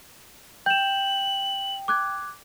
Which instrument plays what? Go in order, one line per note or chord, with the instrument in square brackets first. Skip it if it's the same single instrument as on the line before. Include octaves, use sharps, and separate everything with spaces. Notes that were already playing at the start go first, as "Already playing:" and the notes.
[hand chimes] G5 [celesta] G6 E7 [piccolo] F#7
[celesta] D6 F#6 G#6